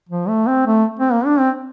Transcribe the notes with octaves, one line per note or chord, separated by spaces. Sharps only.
F3
A3
C4
A3
C4
A#3
D4
C4